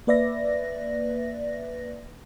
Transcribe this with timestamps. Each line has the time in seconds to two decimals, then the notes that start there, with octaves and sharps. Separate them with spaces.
0.07 A#3 B4 D5 E5 A#6